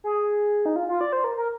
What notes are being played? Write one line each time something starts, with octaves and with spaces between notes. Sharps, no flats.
G#4
D#4
F4
F4
D5
C5
A#4
A#4